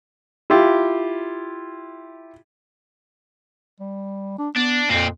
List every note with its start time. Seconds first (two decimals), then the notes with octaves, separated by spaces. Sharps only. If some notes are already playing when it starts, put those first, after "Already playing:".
0.50 E4 F4 G4
3.80 G3
4.38 D4
4.56 B3 D4
4.89 F2 A#2 C4